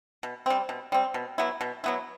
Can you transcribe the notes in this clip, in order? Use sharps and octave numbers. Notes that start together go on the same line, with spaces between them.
B2
G3 C4
B2
G3 C4
B2
F#3 B3 E4
B2
F#3 B3 E4